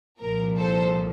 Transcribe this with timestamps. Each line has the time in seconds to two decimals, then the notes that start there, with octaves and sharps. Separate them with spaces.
0.19 C2 A#2 F3 A#4
0.57 A4 C5